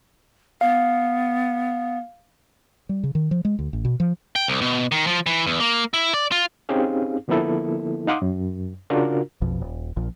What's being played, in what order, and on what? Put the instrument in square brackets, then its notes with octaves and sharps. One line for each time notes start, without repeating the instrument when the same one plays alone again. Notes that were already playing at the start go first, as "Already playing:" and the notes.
[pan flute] B3 [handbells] F5
[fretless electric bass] G3
C#3
D#3
F3
G#3
D2
A1
B2
F3
[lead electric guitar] G5
C2
B2
D#3
F3
E3
E2
A#3
E4
D5
F4
[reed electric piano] C4 C#4 D#4 G4 G#4 F5
D3 F3 A#3 B3 E4 A4
D#4 F5 F#5 C6 D6 D#6
F#2
C#3 D4 F4 F#4 A#4
[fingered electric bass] A#1 F2 B2 F3
D#1
A#1 A#2 F3